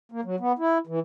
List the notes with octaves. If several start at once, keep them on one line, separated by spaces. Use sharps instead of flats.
A#3
F#3
B3
E4
E3